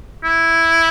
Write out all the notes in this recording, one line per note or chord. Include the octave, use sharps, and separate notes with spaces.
E4